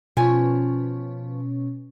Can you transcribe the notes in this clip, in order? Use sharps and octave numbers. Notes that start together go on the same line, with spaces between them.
B2 F3 C#4 G#5